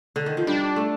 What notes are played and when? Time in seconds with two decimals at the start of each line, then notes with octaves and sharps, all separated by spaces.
0.16 D3
0.26 D#3
0.37 F3
0.47 G3 D4
0.76 A3